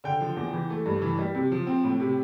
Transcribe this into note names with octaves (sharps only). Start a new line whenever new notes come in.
D3 G5
F3
E2
E3
A3
G2
E3
G3
C3
F3
C4
A2
C3